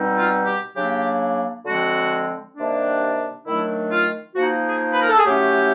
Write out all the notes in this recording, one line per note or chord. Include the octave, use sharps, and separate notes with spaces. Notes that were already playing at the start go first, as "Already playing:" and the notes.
Already playing: B2 G3 C4 D#4
F4
G4
C#3 F#3 A#3 D4 G4
D3 F3 G#3 C4 F#4
C3 D#3 G3 A#3 D4
D#3 F#3 A3 D4 E4
F4
F3 A#3 D#4 F#4
G#4
B4
A#4
A4
G#4
F#3 A3 C#4 E4 G4